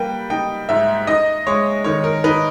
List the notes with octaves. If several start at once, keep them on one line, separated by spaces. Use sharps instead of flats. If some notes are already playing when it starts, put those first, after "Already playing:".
Already playing: G3 A#3 B4 G5
D#4 G5
G#2 E5
D#4 D#5
G#3 C#5
D#3 C#5
A#4
D#4 B4